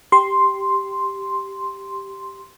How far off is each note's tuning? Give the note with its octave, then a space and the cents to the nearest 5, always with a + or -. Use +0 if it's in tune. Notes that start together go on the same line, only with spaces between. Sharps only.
G4 +0 C6 +0